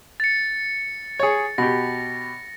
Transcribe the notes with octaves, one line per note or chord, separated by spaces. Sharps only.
A6 C#7
G#4 C#5
B2 G4 A#6